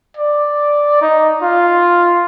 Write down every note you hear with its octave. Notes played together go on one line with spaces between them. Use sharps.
D5
D#4
F4